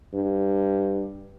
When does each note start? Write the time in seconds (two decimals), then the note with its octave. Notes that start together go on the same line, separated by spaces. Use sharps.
0.13 G2